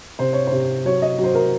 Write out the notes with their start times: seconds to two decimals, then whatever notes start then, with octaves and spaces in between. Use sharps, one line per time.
0.19 C3 C5
0.33 C#5
0.47 C5
0.52 C3
0.85 F#3 C#5
1.02 D#5
1.19 F#3
1.24 C5
1.35 A#4